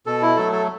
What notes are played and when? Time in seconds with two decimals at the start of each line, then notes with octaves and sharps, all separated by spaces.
0.06 B2 A4
0.22 E4
0.37 F#3 A3 A4
0.52 A4